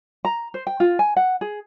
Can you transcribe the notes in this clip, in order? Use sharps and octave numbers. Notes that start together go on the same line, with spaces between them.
A#5
C5
G5
F4
G#5
F#5
G#4